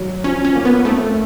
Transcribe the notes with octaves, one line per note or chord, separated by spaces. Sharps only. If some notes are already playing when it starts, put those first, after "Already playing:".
Already playing: F#3
F3 C#4
C#4
A#3
B3
A3 C4